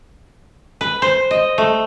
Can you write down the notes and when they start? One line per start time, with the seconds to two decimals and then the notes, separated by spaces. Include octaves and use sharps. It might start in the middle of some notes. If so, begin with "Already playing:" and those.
0.81 B4
1.02 C5
1.31 D#5
1.58 A3